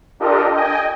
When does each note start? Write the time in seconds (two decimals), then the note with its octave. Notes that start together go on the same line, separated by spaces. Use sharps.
0.20 D4 F4 G4 A4 A#4 D#5
0.54 D#5 G5 G#5